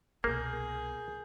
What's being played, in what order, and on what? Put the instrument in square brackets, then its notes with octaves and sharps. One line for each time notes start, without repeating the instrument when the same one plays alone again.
[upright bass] C2 B2 [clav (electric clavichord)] A#3 [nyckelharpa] G#4 [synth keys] A#4 G6